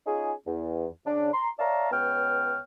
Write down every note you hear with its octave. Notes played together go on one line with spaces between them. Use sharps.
C#4 D#4 F4 G#4
E2
C#3 D4
A#5 C6
C#5 D5 E5 F5 A5 A#5
C#2 B3 C#5 G5 F6